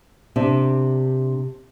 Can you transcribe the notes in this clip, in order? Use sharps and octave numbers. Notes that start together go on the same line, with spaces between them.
C3 D4